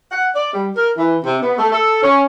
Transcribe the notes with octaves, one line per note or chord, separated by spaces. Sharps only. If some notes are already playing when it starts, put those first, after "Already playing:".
F#5
D5
G3
A#4
E3
C3
B3
A3
A4
C#4